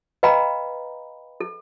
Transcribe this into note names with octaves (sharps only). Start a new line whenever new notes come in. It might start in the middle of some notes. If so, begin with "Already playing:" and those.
B4 D#5 F5 G5 A#5 B5
A4